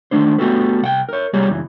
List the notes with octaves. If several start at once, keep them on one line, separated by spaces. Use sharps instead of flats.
D#3 A3 D4 C5
A3 B3 F#4 G4 A4 B4
C2 F#5 G5
A#4 C#5
C2 G3 A#3 G4 G#4 C#5
C#2 F#2 E3